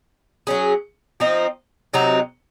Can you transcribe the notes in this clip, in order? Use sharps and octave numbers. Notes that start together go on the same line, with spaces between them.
F#3 C#4 G#4
F3 C4 D#4
C3 F#3 C4 D#4